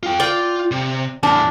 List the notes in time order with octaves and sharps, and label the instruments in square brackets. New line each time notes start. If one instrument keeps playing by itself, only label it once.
[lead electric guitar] F4 G5
[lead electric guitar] F4 [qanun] D5 G5
[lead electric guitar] C3
[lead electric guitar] E2 A2 [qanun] D4